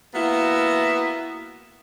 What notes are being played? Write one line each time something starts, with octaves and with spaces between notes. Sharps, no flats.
A#3 B3 E4 F#4